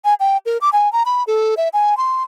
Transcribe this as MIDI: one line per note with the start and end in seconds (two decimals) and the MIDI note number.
0.05 0.14 80
0.20 0.37 79
0.46 0.58 70
0.61 0.70 86
0.73 0.91 80
0.93 1.03 82
1.06 1.24 83
1.27 1.55 69
1.57 1.69 76
1.73 1.97 80
1.97 2.23 84